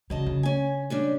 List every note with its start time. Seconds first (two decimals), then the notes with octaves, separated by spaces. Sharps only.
0.10 C#3 F#3 D#5 A5
0.26 C#3
0.43 C#4 G#5
0.90 G3 C#4 D4